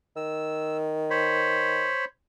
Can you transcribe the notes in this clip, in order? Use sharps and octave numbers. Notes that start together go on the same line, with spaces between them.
D#3 E6
C5 C#5 B5